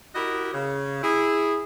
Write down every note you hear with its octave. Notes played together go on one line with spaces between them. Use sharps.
E4 F#4 G4 A#4 D#5
C#3
E4 G#4